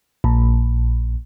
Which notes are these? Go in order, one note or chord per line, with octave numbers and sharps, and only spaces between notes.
A#1